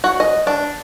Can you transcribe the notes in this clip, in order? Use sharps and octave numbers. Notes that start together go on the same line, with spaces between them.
F#4
D#5
D4